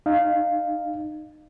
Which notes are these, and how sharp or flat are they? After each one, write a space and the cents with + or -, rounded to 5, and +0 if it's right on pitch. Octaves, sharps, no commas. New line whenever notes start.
D#4 -30 F5 +0